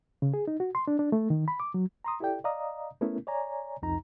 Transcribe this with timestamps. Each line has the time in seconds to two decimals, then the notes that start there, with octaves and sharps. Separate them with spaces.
0.22 C#3
0.34 G#4
0.48 D#4
0.60 F#4
0.75 C6
0.88 D4
0.99 D4
1.12 A3
1.30 D#3
1.48 B5
1.60 D6
1.74 F#3
2.04 A#5 C6 D#6
2.20 E4 G4 A4 D5 G5
2.44 D5 D#5 F5 A#5 D#6
3.01 A3 B3 C#4 E4 A#4
3.27 C#5 D5 G#5 A#5
3.82 C2 F2 D#4 A#5